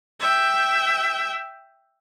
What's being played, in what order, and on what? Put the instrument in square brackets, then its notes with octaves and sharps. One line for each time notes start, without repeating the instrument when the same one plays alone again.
[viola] E5 G5